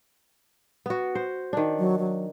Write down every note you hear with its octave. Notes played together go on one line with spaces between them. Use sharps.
B3 F#4
C5
D#3 D4
F#3
F#3